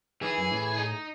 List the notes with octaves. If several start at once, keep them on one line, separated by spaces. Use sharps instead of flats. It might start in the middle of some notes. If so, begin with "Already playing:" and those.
D#3 E3 G#4
F#2
A2
D#4